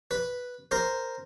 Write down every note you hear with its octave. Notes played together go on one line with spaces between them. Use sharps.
B4
A#4 C5